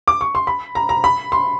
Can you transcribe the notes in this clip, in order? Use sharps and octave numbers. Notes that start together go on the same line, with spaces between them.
D6
C#6
C6
B5
A#5
A#5
B5
C6